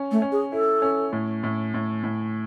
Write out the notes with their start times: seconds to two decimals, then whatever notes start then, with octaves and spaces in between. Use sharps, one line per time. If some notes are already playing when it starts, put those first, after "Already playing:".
Already playing: C#4
0.11 A3
0.22 C#4
0.32 G#4
0.52 E4 A4
0.82 C#4
1.13 A2
1.43 A2
1.74 A2
2.04 A2